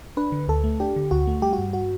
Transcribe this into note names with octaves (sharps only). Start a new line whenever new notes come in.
D4 B4
D3
D2 A4
A3
D4 G4
D3
D2 F#4
A3
G3 G4
F#4
G2
F#4